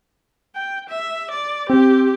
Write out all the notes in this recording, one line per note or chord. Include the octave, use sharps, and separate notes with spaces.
G5
E5
D5
C4 G4